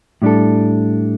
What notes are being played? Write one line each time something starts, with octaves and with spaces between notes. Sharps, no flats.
A2 G3 D4 A4